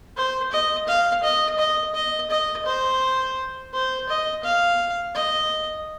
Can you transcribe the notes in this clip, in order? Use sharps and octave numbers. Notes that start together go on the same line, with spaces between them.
C5
D#5
F5
D#5
D#5
D#5
D#5
C5
C5
D#5
F5
D#5